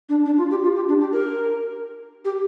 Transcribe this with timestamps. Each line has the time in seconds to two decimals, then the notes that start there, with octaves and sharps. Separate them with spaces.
0.09 D4
0.26 D4
0.38 F4
0.51 G4
0.63 F4
0.75 G4
0.88 D4
1.01 G4
1.12 A#4
2.25 G4